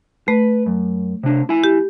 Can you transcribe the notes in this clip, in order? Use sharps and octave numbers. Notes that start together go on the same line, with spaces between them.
A3 B4
F#2
C3 D4
E4 G#5
G4